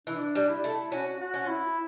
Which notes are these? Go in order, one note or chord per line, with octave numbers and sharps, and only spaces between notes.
E3 D4
G3
E4
A3
C#4 F#4
F#4
C#4
E4